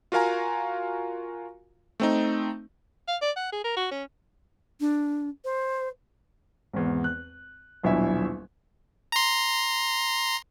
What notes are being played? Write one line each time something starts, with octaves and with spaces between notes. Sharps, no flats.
F4 F#4 A#4 F5 G#5 A#5
A3 C4 D#4
F5
D5
F#5
G#4
A#4
F#4
C#4
D4
C5
G#1 E2
F#6
D#1 B1 D4 E4 E5 G#5
A#5 C6